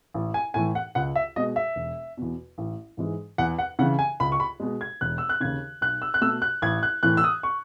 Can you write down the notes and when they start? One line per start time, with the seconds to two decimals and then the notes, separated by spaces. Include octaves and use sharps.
0.14 A1
0.34 G#5
0.54 A2 E3 G#5
0.75 F#5
0.95 C#2 F#5
1.16 E5
1.36 B2 G#3 D#5
1.56 E5
1.76 E1
2.17 E2 B2
2.58 A1
2.97 G#2 E3 G#3
3.38 E2 F#5
3.59 F#5
3.79 C#3 E3 F#5
3.99 G#5
4.20 C#2 B5
4.32 C#6
4.40 B5
4.60 B2 G#3
4.81 G#6
5.01 E1 F#6
5.18 E6
5.29 F#6
5.40 D#2 C#3 G#6
5.81 B1 F#6
6.02 E6
6.14 F#6
6.21 B2 A3 E6
6.42 F#6
6.62 A1 G#6
6.83 F#6
7.03 A2 E3 F#6
7.17 E6
7.24 D#6
7.43 C#6